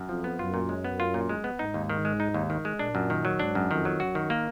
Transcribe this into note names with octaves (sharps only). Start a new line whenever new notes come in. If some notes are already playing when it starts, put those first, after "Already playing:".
Already playing: F#2
F2 F3
B3
F#2 F4
A#2
G#3
B3
F4
A#2
G#3
B3
G#2 D#4
D#2
D#3
G#3
D#4
D#2
D#3
G#3
A#2 D4
F#2
D#3
F#3
G#2 D4
F#2
F2 D#3
F#3
F#2 F#4
D#3
A#3